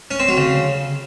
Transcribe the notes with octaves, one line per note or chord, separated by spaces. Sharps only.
C#4
C4
F#3
C#3